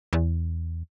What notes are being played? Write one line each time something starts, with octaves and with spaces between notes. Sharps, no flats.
E2